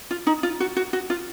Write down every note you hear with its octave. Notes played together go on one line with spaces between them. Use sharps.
F4
D#4
F4
F#4
F#4
F#4
F4